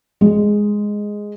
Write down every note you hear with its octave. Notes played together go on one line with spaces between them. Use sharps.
G#3